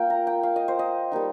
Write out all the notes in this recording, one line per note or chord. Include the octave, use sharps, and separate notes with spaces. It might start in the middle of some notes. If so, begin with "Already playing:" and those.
Already playing: A#3 F4 F5 G5
A#5
G5
F5
D#5
C5
D#5
G3 A#3 D#4